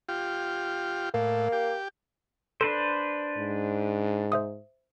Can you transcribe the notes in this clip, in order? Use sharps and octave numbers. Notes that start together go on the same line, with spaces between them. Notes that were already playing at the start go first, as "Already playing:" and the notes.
F4 G4
A2 A#3
G4
D4 A4 B4 C5
G#2
C5 E5 D#6